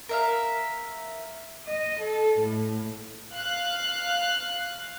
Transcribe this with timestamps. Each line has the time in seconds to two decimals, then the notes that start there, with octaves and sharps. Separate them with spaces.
0.09 A#4 E5 F5
1.67 D#5
2.01 A4
2.40 A2
3.33 F5 F#6